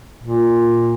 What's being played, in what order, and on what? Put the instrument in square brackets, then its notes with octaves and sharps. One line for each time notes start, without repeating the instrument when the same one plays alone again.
[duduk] A#2